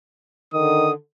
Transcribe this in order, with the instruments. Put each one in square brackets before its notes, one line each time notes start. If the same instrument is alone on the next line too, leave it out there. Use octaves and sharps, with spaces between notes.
[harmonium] D3 [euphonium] D#3 [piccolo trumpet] D#6